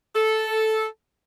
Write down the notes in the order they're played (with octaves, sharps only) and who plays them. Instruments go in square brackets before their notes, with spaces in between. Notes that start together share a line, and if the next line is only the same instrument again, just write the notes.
[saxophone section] A4